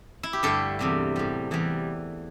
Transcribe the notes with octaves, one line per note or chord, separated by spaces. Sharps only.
E4
G4
G2 D3 A3 A4
E2 C3 G3
A2 G3
E2 E3 G3